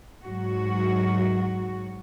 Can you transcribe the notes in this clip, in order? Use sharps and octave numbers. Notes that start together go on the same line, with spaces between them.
G#2 F#3 F#4